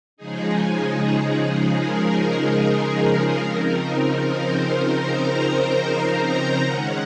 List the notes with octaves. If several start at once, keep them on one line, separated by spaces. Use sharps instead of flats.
C#3 F3 G#3 D#4 G#4
A#4
C#3 F3 C4 D#4
C5
A#5
D#3 G#3 C#4 F#5